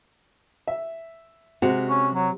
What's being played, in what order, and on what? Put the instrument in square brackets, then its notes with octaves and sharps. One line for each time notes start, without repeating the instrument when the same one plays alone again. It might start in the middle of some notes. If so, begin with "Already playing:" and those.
[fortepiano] E5
[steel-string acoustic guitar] C3 [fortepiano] G#3 F#4 F#5
[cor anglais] C#4
F#3